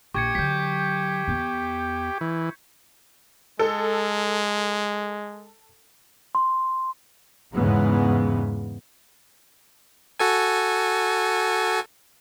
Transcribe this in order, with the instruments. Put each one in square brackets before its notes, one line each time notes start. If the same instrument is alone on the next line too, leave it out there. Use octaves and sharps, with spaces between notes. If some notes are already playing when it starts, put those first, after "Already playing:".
[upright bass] A#1 [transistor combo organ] G4 [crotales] C#6 G#6 C#7
[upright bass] D3 F#3 [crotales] G6 B6
[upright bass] E2 B3
[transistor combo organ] E3
[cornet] G#3 [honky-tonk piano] A4
[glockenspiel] C6
[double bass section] E2 G#2 C#3 E3 G#3 B3
[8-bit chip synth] F#4 A4 G#5